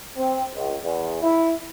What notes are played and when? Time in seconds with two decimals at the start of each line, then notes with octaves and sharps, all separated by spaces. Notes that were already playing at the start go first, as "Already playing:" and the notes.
0.16 C4
0.55 C#2
0.84 E2
1.22 E4